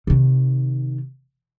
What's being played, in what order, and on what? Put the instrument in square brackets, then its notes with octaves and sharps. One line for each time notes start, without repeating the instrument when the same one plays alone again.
[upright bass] C3 D#3